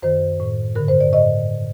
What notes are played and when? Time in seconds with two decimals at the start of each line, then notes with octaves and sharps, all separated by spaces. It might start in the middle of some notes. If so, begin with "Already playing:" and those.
0.02 F#2 D#3 C5
0.40 A2
0.75 G2 D3 A#4
0.88 C5
1.00 D5
1.13 A2 D#5